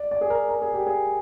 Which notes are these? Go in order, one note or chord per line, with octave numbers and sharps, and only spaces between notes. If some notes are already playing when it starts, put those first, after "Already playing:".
Already playing: D5
D5
G#4
A#4
A#4
G#4
G4
G#4